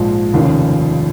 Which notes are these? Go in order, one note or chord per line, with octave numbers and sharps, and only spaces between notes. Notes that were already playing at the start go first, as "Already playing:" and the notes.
Already playing: A#1 G#2 F3 G#3
F1 D#2 C#3 F3